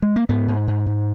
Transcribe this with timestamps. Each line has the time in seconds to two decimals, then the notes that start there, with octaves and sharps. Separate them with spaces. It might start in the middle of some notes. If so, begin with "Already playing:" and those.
0.02 G#3
0.16 A#3
0.29 G#2 B3
0.48 G#2
0.67 G#2
0.86 G#2